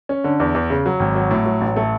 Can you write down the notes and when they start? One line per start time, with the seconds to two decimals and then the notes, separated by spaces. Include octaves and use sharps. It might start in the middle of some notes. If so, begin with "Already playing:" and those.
0.09 C#4
0.24 D3
0.40 E2
0.55 E2
0.70 C#3
0.86 F#3
1.00 G#1
1.15 F#3
1.31 A2
1.46 F#3
1.61 A1
1.76 A3